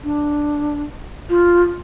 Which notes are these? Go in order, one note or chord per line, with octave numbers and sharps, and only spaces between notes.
D4
F4